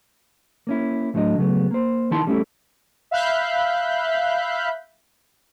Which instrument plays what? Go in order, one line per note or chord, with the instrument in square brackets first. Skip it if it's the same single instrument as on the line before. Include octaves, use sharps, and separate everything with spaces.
[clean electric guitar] A#3 C#4 E4
D2 A2 D3 F#3 D#5
C#3 F#3 A3 B3
A#3 C5
D#3 D#4 E4 G5 A5 C6
G3 A3 C#4 E4 A4
[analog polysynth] E5 F5 B5 F#6 G6 B6